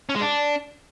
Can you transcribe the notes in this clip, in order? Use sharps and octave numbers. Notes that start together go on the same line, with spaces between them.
C#4
G#3
D4